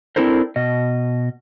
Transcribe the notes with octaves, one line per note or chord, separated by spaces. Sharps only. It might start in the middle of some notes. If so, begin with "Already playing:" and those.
C4 D4 E4 A4 A#4 C5
B2 D#5